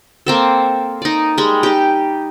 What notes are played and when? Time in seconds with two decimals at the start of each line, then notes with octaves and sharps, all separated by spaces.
0.26 A#3 C4 A4
1.02 D#4 D5
1.38 G3 G#3
1.63 D#4 G4